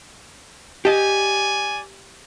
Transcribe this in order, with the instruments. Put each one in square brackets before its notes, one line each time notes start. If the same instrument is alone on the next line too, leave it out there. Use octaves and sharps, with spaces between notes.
[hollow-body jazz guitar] G4 D#5 [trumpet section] D5 G#5